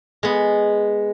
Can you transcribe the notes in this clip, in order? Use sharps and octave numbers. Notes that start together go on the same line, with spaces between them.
G#3 B3